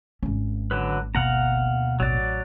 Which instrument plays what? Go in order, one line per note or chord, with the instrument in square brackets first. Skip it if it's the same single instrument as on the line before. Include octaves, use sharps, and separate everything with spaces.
[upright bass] G#1 C#4
[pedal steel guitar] D3 F#3 B4
[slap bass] D2 B2 A#3 [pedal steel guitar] F5 F#5 A#5
[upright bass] A1 [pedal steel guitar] F#3 D5